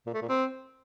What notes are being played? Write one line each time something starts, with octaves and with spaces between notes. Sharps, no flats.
A#2
A3
A#2
C4